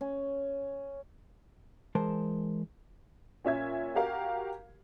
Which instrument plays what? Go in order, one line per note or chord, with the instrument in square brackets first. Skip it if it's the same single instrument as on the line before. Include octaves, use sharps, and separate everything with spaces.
[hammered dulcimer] C#4
[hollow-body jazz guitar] E3 G#3 A#4 C5 A5
[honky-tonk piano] A#2 C#4 E5 G#6
F#4 G4 A#4 F5